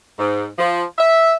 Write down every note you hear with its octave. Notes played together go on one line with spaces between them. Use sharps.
G#2
F3
E5